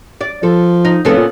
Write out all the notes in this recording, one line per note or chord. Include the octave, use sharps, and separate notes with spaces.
D5
F3 A4
D#4
F1 C#3 B3 A4
A#2